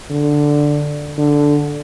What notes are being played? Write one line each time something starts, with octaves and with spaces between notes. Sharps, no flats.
D3
D3